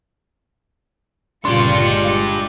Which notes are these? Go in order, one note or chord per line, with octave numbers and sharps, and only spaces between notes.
G1 A#2 C#3 D4 F4 G4 C6 C#7
G#3